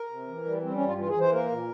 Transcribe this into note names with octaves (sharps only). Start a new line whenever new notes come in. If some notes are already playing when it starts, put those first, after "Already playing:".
Already playing: A#4
C3
E3
G3
G3 C4
C#4
G2 F4
E3 F4
G#4
E3
C5
A#3 A#4
A#2